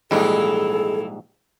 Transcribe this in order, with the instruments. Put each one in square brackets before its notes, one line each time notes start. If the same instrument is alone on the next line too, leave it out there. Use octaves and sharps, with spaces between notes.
[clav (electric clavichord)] A#1 G#2 G3 [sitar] E3 D#4 E4 [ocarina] G#4 [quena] A4